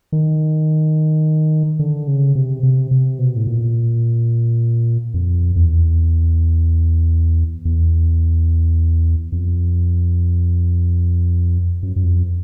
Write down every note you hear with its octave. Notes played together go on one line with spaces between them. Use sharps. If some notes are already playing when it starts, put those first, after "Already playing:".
D#3
D3
C#3
C3
C3
C3
B2
A2
A#2
F2
E2
E2
F2
F#2
F#2
F2